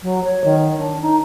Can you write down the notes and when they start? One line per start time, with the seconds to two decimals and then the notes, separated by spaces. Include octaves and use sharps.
0.02 F#3
0.23 C#5
0.43 D#3
0.78 D4
1.01 D#4